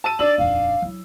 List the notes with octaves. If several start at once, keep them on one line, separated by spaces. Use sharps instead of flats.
A5 E6 D#7
D4 D#4 D5 E6 F#7
D#1 F2 F5
F#3 E4